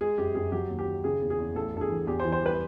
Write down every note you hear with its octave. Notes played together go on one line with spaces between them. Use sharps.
G#3 G#4
F#2 G4
F#2 G#4
F#3 G4
D#2
G4
D#3
C#3 G#4
E2
G#4
E2
A1 A4
G2 A4
G#4
E3
E2 G4
C5
E3
C5
G3 B4